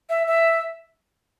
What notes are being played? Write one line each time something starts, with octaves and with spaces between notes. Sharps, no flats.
E5
E5